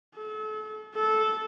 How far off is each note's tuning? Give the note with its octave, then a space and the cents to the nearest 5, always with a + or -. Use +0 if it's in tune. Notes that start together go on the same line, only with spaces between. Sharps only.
A4 -35
A4 -15